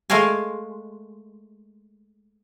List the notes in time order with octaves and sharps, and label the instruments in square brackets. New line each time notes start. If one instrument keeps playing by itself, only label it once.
[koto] G#3 A3 A#4 F5 G#5